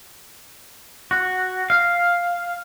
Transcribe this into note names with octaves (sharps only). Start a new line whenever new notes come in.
F#4
F5